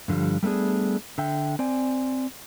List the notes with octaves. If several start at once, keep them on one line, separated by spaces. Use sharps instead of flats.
G2 D3 F3 G3
G3 A3 B3 D4 G#4
D3 E5 G5
C4 D5 G#5